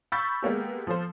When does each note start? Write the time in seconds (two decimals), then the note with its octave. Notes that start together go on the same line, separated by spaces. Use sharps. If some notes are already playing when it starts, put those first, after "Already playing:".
0.12 B5 C#6 E6 G6 A6 B6
0.42 G#3 A#3 B3 G4
0.87 F3 F4 A4 C5